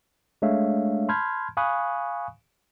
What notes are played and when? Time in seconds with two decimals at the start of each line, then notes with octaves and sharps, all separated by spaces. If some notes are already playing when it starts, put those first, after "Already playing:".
0.42 G#3 A3 D4 C#5 E5 F5
1.09 A5 B5 C6 F6 G6 G#6
1.57 F5 G#5 B5 C#6 D#6 F#6